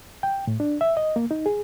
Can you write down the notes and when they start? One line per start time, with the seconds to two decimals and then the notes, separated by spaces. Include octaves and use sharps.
0.23 G5
0.47 A2
0.60 D4
0.81 E5
0.97 D#5
1.16 A#3
1.31 D#4
1.46 G#4